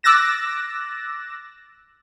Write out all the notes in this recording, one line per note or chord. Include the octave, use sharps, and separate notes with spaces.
D6 E6 F#6 A6 A#6 E7